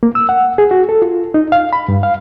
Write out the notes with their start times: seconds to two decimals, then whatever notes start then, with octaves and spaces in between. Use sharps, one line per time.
0.03 A#3
0.15 E6
0.29 F#5
0.58 G#4
0.71 F#4
0.89 A4
1.02 F4
1.34 D#4
1.52 F5
1.73 B5
1.88 G2
2.03 F5